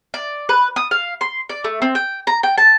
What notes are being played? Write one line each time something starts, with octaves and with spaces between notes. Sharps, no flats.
D5
B4
D#6
F5
C6
D5
A3
C4
G5
A#5
G5
A5